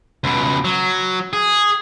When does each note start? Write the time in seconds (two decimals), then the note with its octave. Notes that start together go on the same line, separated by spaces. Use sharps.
0.24 C#2 B2
0.65 F#3
1.33 G#4